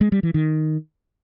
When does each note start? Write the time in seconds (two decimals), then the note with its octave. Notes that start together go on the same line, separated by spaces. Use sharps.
0.01 G#3
0.12 G3
0.23 E3
0.34 D#3